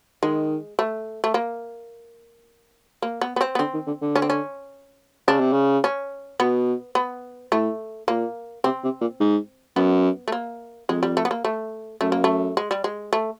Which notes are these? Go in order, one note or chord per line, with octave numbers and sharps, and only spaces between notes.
D#3 G#3
A3
A3
A#3
A#3
B3
B3
C4
B3
D3 C4
D#3
D3
D3
C#4
C4
C#4
C#3 D4
C3
C#3
C#4
B2 B3
B3
A2 A3
A#2 A#3
C3 C4
C3
A#2
G#2
F#2 B3
A3
A#3
F2 G#3
G3
A3
B3
A#3
A3
F#2 A3
A#3
A3
G#3
G3
G#3
A3